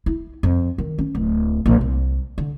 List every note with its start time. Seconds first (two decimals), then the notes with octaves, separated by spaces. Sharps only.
0.06 E4
0.43 F2
0.78 D#3
0.99 C#4
1.15 D1
1.66 A#1
1.81 C2
2.38 D3